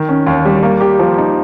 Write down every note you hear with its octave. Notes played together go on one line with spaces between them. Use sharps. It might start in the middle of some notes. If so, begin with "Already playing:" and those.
Already playing: D#3
C#4
D#2
G3
A#3
G4
F3
D#4